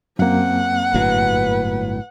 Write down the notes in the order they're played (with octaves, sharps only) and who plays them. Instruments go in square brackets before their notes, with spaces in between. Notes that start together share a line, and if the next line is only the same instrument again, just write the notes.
[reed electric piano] F#2 A#3 [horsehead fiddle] C4 [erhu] F#5
[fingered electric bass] G1 A2 F#3 [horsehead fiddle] B4